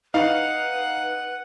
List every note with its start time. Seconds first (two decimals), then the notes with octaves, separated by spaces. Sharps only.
0.14 D#4 B4 F5 F#5